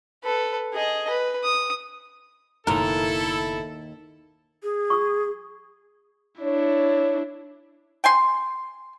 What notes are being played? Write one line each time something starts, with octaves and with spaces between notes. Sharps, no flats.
A4 B4
G#4 D#5
B4
D#6
F#1 D#2 B2 E4 A4 A#4
G#4
C#6 D#6
D4 E4 C#5
G5 G#5 C6